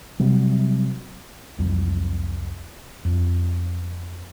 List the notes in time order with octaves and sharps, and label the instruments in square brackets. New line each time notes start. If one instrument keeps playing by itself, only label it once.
[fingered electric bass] C3 F#3 G3
C2 F2 F#3
F2